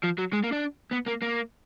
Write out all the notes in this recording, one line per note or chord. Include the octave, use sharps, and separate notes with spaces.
F3
F#3
G#3
A#3
D4
B3
A#3
A#3